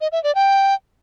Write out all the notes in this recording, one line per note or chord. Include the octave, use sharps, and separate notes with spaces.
D#5
E5
D5
G5